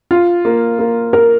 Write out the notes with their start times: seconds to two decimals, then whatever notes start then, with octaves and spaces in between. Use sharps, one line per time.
0.11 F4
0.45 A#3
0.79 A#3
1.13 A#4